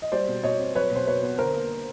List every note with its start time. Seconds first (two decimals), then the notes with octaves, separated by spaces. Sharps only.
0.02 D#5
0.12 G3 C5 D5
0.28 B2
0.44 B2 C#5 D#5
0.59 C4
0.75 F#3 B4 C#5
0.91 B2 C5
1.07 B2 B4 C#5
1.23 B3
1.38 D3 A#4 C5
1.55 A#3